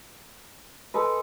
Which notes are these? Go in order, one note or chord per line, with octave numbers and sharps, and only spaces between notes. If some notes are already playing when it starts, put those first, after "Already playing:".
G#3 A4 B4